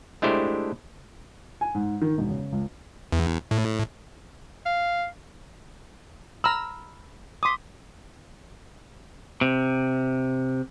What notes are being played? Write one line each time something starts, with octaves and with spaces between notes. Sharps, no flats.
G#3 A3 D4 E4 G4 C5
G#5
G#2
D#3
E1
C#3
C#2
E2
A2
F5
A#5 B5 E6 F6
C6 D6 D#6 B6
C3